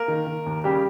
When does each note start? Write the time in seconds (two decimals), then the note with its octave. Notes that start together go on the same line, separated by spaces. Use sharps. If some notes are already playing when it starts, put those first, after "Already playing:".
Already playing: A#3 A#4
0.08 D#3
0.27 D#3
0.46 D#2
0.64 C#3 G3 G4